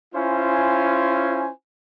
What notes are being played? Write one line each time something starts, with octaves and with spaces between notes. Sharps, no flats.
C#4 E4 F4 C5 G#5